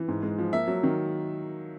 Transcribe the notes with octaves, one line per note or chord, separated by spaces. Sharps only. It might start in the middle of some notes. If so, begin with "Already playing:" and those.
Already playing: E3
G#2
G#3
F3
A#3 E5
F#3
D#3